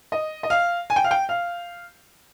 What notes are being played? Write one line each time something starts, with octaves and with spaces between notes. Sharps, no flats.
D#5
D#5
F5
G#5
G5
F5
G5
F5